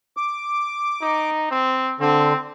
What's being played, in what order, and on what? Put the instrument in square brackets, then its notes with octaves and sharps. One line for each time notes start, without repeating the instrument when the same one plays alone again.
[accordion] D6
[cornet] D#4
C4
[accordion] D3 [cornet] C4